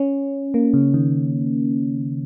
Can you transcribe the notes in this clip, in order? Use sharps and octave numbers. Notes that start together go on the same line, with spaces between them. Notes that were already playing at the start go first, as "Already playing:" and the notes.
Already playing: C#4
A#3
C#3
D#3